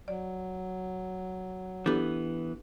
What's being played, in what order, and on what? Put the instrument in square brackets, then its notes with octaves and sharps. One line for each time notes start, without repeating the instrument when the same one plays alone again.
[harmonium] F#3 [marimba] D5
[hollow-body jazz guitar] E3 B3 [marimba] D4 G4 A4